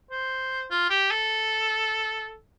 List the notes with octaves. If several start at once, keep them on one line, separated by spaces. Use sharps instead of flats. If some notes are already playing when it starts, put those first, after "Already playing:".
C5
F4
G4
A4